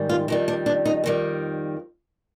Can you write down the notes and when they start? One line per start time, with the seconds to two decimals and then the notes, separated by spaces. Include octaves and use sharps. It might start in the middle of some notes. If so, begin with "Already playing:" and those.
Already playing: G#2 D#3 G3
0.09 F4
0.28 F2 D#3 G3 D#4
0.48 D4
0.66 D4
0.85 D#4
1.04 F2 D#3 G3